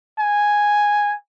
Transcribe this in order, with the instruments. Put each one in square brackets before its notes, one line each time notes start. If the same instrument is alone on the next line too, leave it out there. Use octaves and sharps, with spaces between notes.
[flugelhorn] G#5